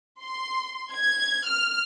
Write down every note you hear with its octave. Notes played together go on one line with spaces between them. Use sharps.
C6
G#6
F6